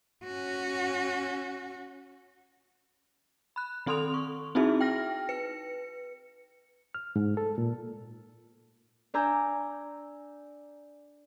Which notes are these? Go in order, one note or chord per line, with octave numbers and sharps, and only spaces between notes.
C#4 F#4
B5 F#6
D#3 C4 A4 C6 D#6 F7
C#6
C4 D#4 E4 F#4 G#4 E5
G5 F6 A#6
B4 C#7
F6
G#2
A4
A#2
D4 D5 G#5 A#5 E6 G6